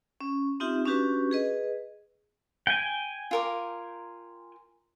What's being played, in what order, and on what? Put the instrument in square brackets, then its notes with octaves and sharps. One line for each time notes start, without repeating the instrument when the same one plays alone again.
[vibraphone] C#4
C4 D#4 F4 G4 E5
C#4 D4 F#4 G4 B4
G#4 B4 D#5
[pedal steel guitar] G5 G#5
[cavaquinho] F4 A#4 D6